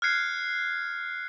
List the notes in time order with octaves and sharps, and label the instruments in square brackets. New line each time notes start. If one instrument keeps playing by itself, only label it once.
[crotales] F6 F#6 G#6 C7 C#7